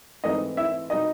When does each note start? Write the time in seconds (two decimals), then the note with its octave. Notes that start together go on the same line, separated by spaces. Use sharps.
0.24 G#2 E3 A3 C4 D#4 D#5
0.57 E4 E5
0.90 B2 G3 D#4 D#5